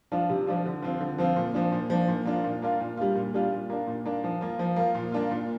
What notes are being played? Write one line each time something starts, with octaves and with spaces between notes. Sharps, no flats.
F3 D4 F4
C3
F3 D4 F4
D3
F3 C4 F4
D3
F3 C4 F4
A#2
F3 D4
A#2
F3 D4
A#2
A#3 D4 F4
A#2
A#3 D4 F4
A#2
G3 D4 F4
A#2
G3 D4 F4
A#2
A#3 D4
A#2
A#3 D4
F3
A#3 F4
F3
A#3 F4
A#2
A#3 D4 F4
A#2